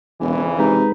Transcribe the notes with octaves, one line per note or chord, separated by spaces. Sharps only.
E1 F2 C#3 E3
C3 G#3 D#4 B4